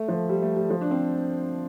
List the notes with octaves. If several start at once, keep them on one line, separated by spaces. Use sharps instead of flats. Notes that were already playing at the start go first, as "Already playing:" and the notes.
Already playing: A3
F3
G3
A3
G3
F3
D4
C4